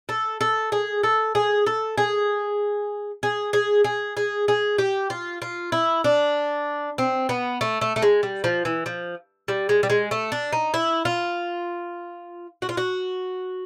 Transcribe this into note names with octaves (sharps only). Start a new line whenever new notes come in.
A4
A4
G#4
A4
G#4
A4
G#4
G#4
G#4
G#4
G#4
G#4
G4
F4
F4
E4
D4
C4
B3
A3
A3
A3
G#3
G3
F3
E3
F3
G3
G#3
G3
G#3
A3
D4
D#4
E4
F4
F#4
F4
F#4